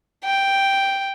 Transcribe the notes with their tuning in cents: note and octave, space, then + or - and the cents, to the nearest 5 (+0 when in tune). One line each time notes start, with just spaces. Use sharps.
G5 +0